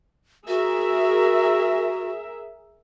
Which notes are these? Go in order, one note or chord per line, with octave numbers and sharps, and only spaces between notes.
F#4 G#4 A#4 E5